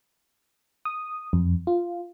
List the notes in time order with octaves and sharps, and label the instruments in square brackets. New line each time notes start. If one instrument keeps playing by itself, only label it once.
[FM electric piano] D#6
F2
F4